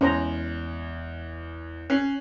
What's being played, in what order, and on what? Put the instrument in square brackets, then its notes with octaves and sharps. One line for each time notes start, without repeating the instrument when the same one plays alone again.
[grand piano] E2 G#3 [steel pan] C#4 C5 A#5
[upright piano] C#4 [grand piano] F#6 C7